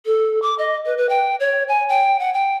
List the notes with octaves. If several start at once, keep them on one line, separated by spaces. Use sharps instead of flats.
A4
D6
D#5
B4
B4
G5
C#5
G#5
G5
F#5
G5